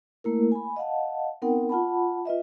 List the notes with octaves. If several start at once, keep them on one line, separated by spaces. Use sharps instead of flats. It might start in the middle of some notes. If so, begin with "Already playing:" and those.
A3 A#3 E4 A#4
G#5 B5
D#5 F5 F#5 A5
B3 C4 D#4 A#4 F#5 G5
F4 F#5 A5 B5
F4 B4 D#5 E5